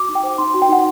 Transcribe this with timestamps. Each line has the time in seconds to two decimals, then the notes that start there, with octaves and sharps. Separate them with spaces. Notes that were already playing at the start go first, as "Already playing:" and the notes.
Already playing: F#4 D6
0.09 D#4
0.15 G5
0.23 C5
0.38 D#4 C6
0.54 F#4
0.62 G5
0.69 D#4 F#5